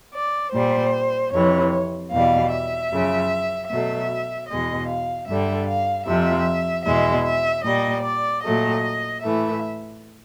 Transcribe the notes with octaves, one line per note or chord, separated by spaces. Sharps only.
D5
A#2 G3 C5
F2 C3 E3 C#5
E2 B2 G3 F5
E5
F#2 C#3 F3
B2 F#3 A3 E5
E2 B2 G#3 D#5
F5
G2 D3 G3 E5
F5
F2 C3 F3 E5
E2 B2 G#3 E5
E5
A#2 G3 D#5
D5
A#2 F#3 A3 D#5
A2 E3 A3 E5